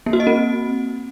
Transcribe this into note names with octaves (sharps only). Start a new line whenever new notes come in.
A#3
F#4
D#5
C4